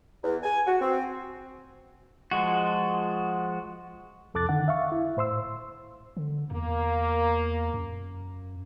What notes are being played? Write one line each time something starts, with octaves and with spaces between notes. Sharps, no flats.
E2
G#5
F#4
C4
F3 G#3 F#4
C2 F2 A4 D6 F#6 A6
D3 D#3 F#5
E5 F5 C#6
E4
A2 C5 C6 E6
D3
E2 A#3
F#2